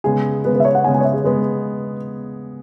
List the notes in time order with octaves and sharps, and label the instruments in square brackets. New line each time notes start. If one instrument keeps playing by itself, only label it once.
[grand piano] C#3 G#3 B3 [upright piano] G#4
[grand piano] C#3 G#3 B3 [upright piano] B4
[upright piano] B4
E5
C#5
F#5
[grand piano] C#3 G#3 B3 [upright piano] G#5
[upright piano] G#5
C#5
E5
G#4
[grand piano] C#3 G#3 B3 [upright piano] B4